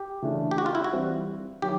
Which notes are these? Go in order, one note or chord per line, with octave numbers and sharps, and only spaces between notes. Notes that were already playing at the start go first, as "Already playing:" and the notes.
Already playing: G4
C#3 E3 A3 D4
G4
F#4
F4
E4
F#4
E3 G3 C4 F4
D#3 F#3 G4